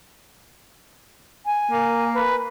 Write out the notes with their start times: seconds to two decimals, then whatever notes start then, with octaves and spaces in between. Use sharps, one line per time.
1.46 G#5
1.72 A#3
2.14 B4